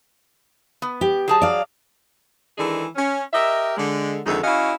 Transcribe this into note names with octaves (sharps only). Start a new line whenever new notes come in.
B3
G4
F#3 G#4 A5
D5 F5
D#3 E3 G#3 D4 G#4 A4
C#4
G4 A#4 D#5 E5
D3 G#3
F2 D3 D#3 G#3 D#4 E5
C#4 E4 F#4 D#5 F5